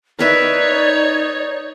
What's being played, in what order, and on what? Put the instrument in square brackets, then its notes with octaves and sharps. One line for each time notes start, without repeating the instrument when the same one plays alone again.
[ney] D#4 [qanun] A#4 B4 E5 [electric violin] C#5 [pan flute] D5